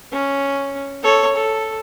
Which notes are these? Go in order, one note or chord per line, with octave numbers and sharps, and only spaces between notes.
C#4
A4 C#5
A4